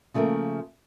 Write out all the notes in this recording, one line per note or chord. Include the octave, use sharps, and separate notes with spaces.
C#3 F3 A3 A#3 A#4